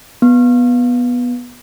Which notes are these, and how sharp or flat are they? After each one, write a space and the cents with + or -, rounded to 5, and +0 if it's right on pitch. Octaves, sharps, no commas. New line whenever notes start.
B3 -10